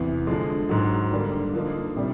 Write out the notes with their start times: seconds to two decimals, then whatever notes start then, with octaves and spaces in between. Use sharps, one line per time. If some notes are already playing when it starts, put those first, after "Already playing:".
Already playing: E2 C3 E3
0.27 D3 F3 G#3
0.69 G#2 D#3 F#3
1.11 D3 G3 A#3
1.54 D3 F3 A#3 D#4
1.96 C3 D#3 G3